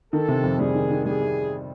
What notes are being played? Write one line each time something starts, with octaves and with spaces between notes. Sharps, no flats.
D#3 A4
C3
F2
G3 G#4
D#3
D#3
G3 G#4
C3